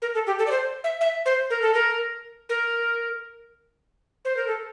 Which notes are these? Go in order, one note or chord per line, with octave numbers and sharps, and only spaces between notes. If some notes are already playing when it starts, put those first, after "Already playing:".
A#4
A4
G4
A4
D5
C5
E5
E5
C5
A#4
A4
A#4
A#4
C5
A#4
A4